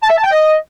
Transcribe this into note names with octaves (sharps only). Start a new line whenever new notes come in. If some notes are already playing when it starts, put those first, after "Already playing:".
A5
E5
A5
G5
D#5